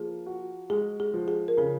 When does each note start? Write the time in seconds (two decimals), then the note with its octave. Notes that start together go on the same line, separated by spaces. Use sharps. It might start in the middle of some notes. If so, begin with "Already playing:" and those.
Already playing: F3 A#3 G#4
0.26 F#4
0.70 G#3 G#4
1.00 G#4
1.14 F3
1.28 G#4
1.48 A#4
1.57 C#3 G#4